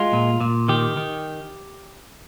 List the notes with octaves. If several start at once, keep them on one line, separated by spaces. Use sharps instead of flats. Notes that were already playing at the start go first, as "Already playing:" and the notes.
Already playing: G#3 F4
A#2
A#2
D#3 G4
D#3